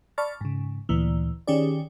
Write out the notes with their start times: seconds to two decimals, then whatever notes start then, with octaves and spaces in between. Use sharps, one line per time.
0.18 D5 A5 B5 C#6 F6 A6
0.41 G#2 C#3
0.89 D2 A#2 E3
1.47 D#3 C#4 G4 G#4 D5